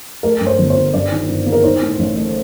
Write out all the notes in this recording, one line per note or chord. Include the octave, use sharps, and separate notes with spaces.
A3 A#4
G2
C5
G1
C5
D3
G2 D5
D#3
G2
A#3
A#4
D#4 C5
A2
A1
A3